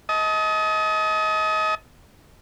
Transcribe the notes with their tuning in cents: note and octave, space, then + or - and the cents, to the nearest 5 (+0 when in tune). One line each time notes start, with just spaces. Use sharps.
D#5 +30 A5 -25